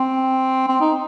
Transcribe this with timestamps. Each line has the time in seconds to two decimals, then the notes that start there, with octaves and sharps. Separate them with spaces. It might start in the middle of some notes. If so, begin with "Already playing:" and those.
Already playing: C4
0.68 C4
0.81 D#4